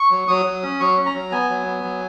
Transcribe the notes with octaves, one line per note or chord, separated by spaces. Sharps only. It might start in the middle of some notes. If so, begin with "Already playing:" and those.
Already playing: C#6
F#3
F#3 D#6
F#3
C#4
F#3 C#6
C#4
A#5
F#3
B3 G#5
F#3
B3
F#3